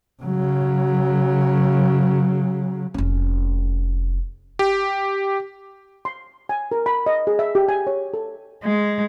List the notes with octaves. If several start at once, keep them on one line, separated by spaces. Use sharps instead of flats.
C#3 F#3
F1 C#4
G4
C6
G#5
A#4
B5
D#5
G#4
E5
G4
G#5
C#5
A4
G#3